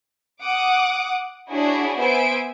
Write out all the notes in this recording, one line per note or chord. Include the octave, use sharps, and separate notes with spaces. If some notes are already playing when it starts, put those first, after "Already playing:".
F#5 D6 D#6
D4 E4 F#4 G#4 C#5
B3 C5 E5 G#5 D7